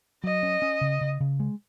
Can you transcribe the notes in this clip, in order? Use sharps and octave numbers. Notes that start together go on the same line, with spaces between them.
F#3 D#5
C#4
C#4
C#3
C#3
C#3
G#3